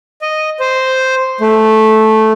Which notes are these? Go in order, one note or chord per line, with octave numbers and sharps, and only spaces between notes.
D#5
C5
A3